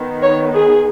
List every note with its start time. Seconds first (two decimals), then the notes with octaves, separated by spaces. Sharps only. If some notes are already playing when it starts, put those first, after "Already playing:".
Already playing: D#3 B3
0.22 C#5
0.55 G#4